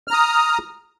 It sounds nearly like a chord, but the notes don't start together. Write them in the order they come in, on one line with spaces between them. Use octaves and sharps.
F6 A#5 D#6